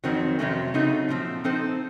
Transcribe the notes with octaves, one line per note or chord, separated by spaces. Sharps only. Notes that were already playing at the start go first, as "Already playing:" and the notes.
F2 D#3 F#3 C4
F2 C3 F#3 A3 C#4
C#3 F#3 A3 C4 D#4
A#2 F3 C4
F3 C4 D#4 A4 C5